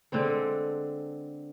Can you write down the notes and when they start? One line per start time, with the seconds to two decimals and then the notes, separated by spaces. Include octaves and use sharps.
0.12 D3 G#3 C4 A4